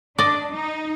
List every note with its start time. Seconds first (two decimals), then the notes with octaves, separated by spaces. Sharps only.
0.18 D4 D5 D#5
0.52 D#4